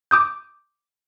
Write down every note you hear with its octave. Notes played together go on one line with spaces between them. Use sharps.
D6 D#6 G6